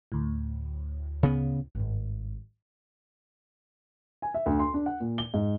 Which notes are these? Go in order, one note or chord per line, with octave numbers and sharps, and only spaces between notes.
D2 A2
C#3 B3
G#1 G2
G#5
E5
D2
C6
D4
F#5
A#2
G7
G#2